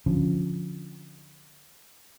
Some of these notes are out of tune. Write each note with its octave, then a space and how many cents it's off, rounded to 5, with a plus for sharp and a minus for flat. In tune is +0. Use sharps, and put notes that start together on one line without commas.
D3 -5 F3 +15 C#4 +0